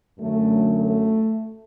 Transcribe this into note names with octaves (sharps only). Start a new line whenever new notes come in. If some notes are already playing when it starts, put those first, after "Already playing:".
F#2 D3 F#3 A3
A3